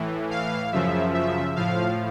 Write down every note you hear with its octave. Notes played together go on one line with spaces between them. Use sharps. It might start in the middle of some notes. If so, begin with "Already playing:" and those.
Already playing: A2 E3
F5
F#2 C#3 F3 E5
E5
A2 F3 F5